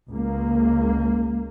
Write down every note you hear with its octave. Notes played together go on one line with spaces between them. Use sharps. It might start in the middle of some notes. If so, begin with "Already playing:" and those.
C#2 A#3